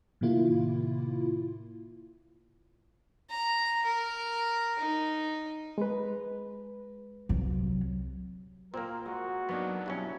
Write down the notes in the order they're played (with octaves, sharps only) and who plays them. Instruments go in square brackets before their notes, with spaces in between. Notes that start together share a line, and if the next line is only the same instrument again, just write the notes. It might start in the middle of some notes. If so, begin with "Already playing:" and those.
[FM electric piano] A2 C3 D#3 A#3 E4 F4
[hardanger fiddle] A#5
A#4
D#4
[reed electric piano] G#3 B4
[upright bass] C2 F#3
[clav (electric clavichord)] A#2 A#3 [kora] C4 [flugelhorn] A#4
[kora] G#3 [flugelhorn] F#4
[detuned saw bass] F#3 [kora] A#3 D4 D#4 [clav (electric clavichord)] B3
[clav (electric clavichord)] G2 B2 C#4 [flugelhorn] E4